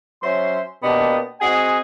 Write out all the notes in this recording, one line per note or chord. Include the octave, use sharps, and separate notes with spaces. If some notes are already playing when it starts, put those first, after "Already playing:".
F#3 C#4 C5 E5 C6
B2 A#3 B3 D4 G4 D#5
C4 F#4 G#4 D#5 F#5 G#5